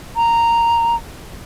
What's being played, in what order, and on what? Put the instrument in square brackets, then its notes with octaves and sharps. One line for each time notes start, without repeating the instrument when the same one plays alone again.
[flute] A#5